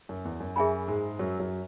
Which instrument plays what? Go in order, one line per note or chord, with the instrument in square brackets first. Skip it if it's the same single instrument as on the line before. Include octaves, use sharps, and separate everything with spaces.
[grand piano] F#2
E2
F#2
[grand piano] F#2 [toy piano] G#4 E5 G#5 B5
[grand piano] G#2 G#3
F#2 F#3
F#2 F#3